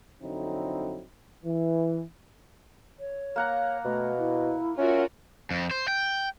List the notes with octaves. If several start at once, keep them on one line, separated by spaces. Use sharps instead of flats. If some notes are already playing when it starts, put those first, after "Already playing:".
F2 D3 F#3 C4 D#4 E4
E3
C#5
A#3 F#5 A#5
B2 A3
E4
C#4 F4 F#4 A#4 E5
F2
C5
G5